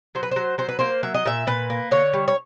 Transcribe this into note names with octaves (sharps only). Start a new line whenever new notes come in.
F#3 C5
B4
F#3 C5
F#3 C5
B4
A#3 C5
F#3 E5
D#5
A#2 E5
A#2 B4
A#3
D3 C#5
G3
C#5